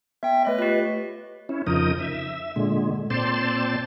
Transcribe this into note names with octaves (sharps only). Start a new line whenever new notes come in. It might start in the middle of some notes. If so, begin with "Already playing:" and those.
B3 E5 G5
A3 B4 C#5 D#5
F4 G4
C#4 E4
F2 C#3 F3 D#4 A#4 D#6
E5
A#2 D3 G#3
A#2 C4 C5 D5 A5 C6